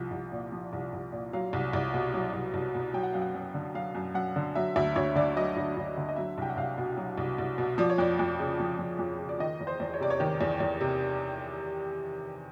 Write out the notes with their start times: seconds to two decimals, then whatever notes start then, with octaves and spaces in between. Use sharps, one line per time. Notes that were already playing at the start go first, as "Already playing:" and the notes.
Already playing: C2 F3
0.11 C2
0.32 A#2
0.52 F3
0.73 C2
0.93 C2
1.12 A#2
1.33 F#3 F5
1.53 C2
1.73 C2
1.94 B2
2.14 F#3
2.33 C2
2.54 C2
2.75 B2
2.94 F#3 G5
3.03 F#5
3.13 F#2 F5
3.22 F#5
3.35 F#2
3.54 D3
3.74 F#3 F5
3.95 F#2
4.15 F#2 F#5
4.36 D3
4.55 F#3 E5
4.76 D2 E5
4.96 D2 C#5
5.15 D3 D5
5.36 F#3 D#5
5.57 D2
5.77 D2
5.97 D3
6.09 D#5
6.16 F#3 E5
6.38 C2 G5
6.50 F#5
6.57 C2 F5
6.78 B2
6.97 F#3
7.18 C2
7.38 C2
7.58 B2
7.78 F3 D5
7.90 C#5
7.98 F2 D5
8.19 F2
8.39 C#3
8.60 F3
8.79 F2
8.99 F2
9.19 C#3
9.29 D5
9.40 D#3 D#5
9.61 E2
9.67 C5
9.80 E2
9.94 C#5
10.00 C3 D5
10.10 C#5
10.20 D#3
10.41 E2
10.60 E2
10.81 C3